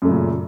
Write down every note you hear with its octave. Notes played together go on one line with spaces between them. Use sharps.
F#2 A#2 C#3 A3